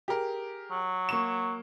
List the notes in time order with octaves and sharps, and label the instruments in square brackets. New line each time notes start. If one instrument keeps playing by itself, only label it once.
[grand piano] G4 G#4 A#4
[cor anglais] F#3
[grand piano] A#3 C#6 E7